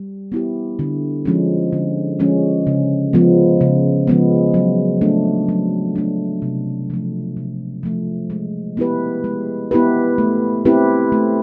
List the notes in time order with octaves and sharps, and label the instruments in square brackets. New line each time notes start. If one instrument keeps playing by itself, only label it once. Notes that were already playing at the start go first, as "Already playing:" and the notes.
Already playing: [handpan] G3
B3 E4 G4
D3
F3 G#3 C#4
D3
F3 G#3 C#4
C#3
F3 G#3 B3
C#3
F3 G#3 B3
F#3
A3 D4
F#3
A3 D4
C3
F3 A3
C3
F3 A3
G#3
B3 E4 G4 B4
G#3
B3 E4 G4 B4
A3
C4 E4 G4 B4
A3